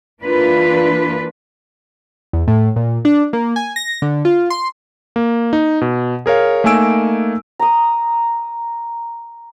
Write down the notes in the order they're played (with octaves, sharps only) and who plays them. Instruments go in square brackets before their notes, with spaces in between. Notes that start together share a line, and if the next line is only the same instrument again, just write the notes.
[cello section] E3 A#3 D4 F4 B4
[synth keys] E2
A2
A#2
D4
A#3
G#5
A#6
D3
F4
C6
[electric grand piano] A#3
D#4
B2
G#4 A#4 C#5 F5
A3 A#3 D#4 G#5 E6 D7
[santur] A#5 D#6